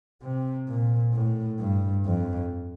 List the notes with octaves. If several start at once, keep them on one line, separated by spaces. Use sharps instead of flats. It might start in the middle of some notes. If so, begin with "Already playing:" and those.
C3
A#2
A2
G2
F2